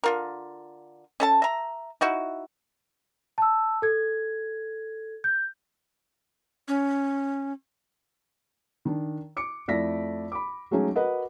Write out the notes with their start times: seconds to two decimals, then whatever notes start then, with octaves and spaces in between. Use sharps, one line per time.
0.04 D3 F4 A#4
1.20 C#4 A4 A5
1.42 E5 A#5
2.01 D#4 E4 F#4
3.38 A5 E6
3.82 A4 G#6
5.24 G6
6.68 C#4
8.85 D#3 D4
9.37 D6 C#7
9.68 F2 A3 E4 D5 A#6 B6
10.32 B5 D6
10.71 F#3 G#3 A3 C#4 D#4 G#4
10.96 F#4 A#4 B4 D#5 F#5